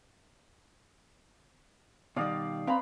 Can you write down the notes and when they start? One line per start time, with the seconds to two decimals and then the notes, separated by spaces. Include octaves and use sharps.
2.16 B2 D#3 G3 D5 F5 D#6
2.67 C4 B4 F5 A#5 B5